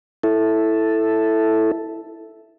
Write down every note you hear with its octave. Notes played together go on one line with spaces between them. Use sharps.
E4 A4